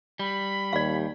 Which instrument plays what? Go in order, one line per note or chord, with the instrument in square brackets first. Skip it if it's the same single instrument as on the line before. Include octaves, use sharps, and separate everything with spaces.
[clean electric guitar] G3 [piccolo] B5
[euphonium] D#2 [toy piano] D5 F5